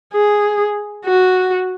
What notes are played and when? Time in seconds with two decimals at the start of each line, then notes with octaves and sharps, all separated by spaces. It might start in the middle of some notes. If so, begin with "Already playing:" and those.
0.13 G#4
1.05 F#4